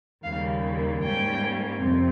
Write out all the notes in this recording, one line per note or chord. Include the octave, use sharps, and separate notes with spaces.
D#2 C#3 G3 A#3 F5
G#2 G3 A#3 C#4 G5
F2 C3 C4